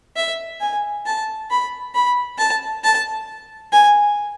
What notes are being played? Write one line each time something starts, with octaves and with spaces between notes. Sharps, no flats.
E5
G#5
A5
B5
B5
A5
A5
G#5